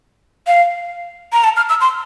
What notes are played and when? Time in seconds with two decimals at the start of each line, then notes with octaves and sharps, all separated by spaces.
0.47 F5
1.33 A#5
1.44 A5
1.57 F6
1.69 E6
1.81 C6